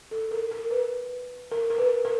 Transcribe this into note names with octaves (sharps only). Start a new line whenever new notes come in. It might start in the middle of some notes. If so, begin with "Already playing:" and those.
A4
A#4
A#4
B4
A#4
A#4
B4
A#4